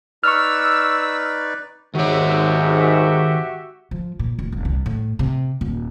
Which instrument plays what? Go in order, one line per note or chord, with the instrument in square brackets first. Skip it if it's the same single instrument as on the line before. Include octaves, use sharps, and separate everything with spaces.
[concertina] D#4 B4 D5 [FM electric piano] C#6 F6 [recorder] E6
[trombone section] G#1 G#2 [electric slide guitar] D#3 C#5 [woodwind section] F#4 G4 E5
[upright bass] F3
A#2
D1
E1
C2
A2
C3
D#1